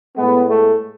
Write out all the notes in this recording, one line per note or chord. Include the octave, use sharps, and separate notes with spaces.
A2 G#3 B3
A3